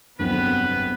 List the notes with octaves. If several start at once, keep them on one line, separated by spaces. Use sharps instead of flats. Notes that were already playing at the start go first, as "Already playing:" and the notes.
G1 C2 F2 F#3 B3 C4 B4